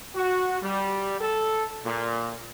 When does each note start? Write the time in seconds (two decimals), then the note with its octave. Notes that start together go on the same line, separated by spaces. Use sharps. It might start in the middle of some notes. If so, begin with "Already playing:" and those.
0.15 F#4
0.63 G3
1.19 A4
1.85 A#2